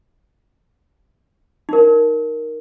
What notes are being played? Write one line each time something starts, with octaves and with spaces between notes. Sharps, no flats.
D#4 A#4